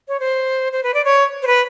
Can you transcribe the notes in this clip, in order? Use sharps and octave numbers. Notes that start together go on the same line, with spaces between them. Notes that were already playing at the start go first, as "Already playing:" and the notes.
C#5
C5
C5
B4
D5
C#5
C5
B4